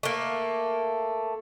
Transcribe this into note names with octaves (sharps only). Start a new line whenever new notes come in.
A3 A#3